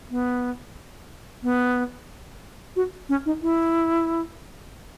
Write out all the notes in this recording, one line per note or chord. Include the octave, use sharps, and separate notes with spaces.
B3
B3
F#4
C#4
D#4
E4